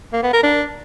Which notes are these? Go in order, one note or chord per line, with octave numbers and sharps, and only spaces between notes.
A#3
B3
A#4
D4